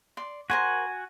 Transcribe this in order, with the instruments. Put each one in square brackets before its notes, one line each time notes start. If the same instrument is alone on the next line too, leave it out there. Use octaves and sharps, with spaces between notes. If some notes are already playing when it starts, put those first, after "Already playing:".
[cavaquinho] D5 C6
[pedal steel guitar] F#4 G#5 [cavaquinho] A#4 C5 F#5